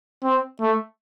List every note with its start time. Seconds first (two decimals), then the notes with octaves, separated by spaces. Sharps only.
0.23 C4
0.61 A3